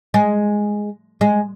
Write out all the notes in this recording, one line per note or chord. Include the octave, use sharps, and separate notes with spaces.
G#3
G#3